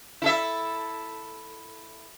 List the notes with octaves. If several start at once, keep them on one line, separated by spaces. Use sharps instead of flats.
E4 A4 E5